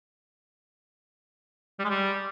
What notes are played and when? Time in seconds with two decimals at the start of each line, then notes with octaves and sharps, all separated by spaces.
1.79 G3
1.85 G#3
1.90 G3